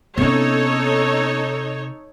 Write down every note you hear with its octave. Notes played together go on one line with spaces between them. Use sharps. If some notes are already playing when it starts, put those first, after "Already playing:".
C3 B3 C#4 D#4 A4 C#5